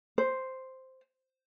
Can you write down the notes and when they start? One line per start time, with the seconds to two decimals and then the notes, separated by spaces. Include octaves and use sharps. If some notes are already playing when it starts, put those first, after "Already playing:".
0.18 C5